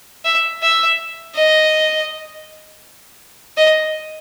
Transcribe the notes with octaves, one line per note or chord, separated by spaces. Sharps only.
E5
E5
D#5
D#5